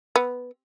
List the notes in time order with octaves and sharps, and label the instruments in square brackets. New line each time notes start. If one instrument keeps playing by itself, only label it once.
[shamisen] B3